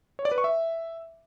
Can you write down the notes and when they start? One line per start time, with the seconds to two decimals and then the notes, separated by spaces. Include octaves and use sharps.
0.19 C#5
0.25 D5
0.32 B4
0.38 C#6
0.44 E5